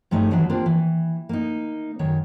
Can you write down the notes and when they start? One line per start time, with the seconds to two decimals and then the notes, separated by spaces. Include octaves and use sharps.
0.11 G2 G#3 A3 D#4 E4 C#5
0.31 D#2 E3 F#3 D4 D#4 F#4
0.50 A#3 C4 D4 F4 G4 A#4
0.66 E3
1.29 A#3 D#4
1.99 F#2 D#3 C#5